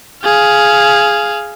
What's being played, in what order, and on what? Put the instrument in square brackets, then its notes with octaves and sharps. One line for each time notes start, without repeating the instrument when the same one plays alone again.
[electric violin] G#4 F5